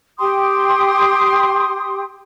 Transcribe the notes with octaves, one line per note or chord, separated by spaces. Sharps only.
G4 G5 C6 D#6